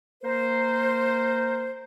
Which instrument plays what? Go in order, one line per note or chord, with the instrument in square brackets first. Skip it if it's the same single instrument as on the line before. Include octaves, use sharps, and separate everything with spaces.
[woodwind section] A#3 A#4 C5